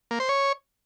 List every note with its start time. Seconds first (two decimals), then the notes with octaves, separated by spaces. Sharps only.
0.11 A#3
0.20 C5
0.29 C#5